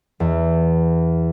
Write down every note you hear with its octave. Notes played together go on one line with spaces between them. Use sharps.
E2